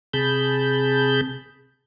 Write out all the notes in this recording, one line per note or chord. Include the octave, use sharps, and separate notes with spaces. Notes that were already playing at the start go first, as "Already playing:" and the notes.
C3 G#4 A5 B5 G6